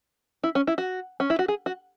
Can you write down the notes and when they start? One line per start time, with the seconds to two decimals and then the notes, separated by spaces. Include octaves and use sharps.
0.44 E4
0.55 C#4
0.67 E4
0.78 F#4
1.20 C#4
1.30 E4
1.39 F#4
1.48 G#4
1.66 F#4